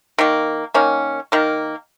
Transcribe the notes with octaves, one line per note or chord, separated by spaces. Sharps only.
D#3 A#3
D#3 A#3 C#4
D#3 A#3